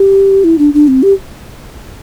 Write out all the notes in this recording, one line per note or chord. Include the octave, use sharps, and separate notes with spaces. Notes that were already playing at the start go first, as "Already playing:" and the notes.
Already playing: G4
E4
D4
D4
C4
G4